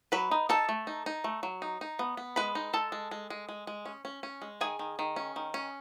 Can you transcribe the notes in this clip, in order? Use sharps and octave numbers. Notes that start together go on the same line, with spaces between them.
F#3 B4 B5
D#4
D#4 A4 A5
A3
D#4
D#4
A3
F#3
D#4
D#4
B3
B3
G#3 B4 B5
D#4
G#3 A4 A5
G#3
G#3
G#3
G#3
G#3
C#4
C#4
C#4
G#3
D#3 G#4 G#5
D#3
D#3
C#4
D#3
C#4